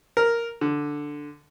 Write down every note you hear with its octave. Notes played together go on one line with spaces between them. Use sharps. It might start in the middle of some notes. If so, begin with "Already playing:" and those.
A#4
D3